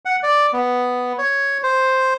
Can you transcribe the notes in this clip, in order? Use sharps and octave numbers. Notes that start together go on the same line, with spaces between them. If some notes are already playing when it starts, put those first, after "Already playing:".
F#5
D5
B3
C#5
C5